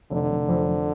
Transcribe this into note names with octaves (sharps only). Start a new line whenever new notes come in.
F1 D3
F1
F2
F2